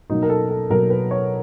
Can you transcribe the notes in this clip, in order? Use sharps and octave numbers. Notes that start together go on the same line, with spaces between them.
B2 F#3 A#3 D#4
A#4
A4
A4
B2 F#3 A#3 A#4
B4
C#5